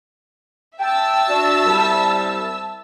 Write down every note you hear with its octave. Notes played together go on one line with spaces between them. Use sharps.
E5 G5 A5 E6
D4 F#4
C2 G3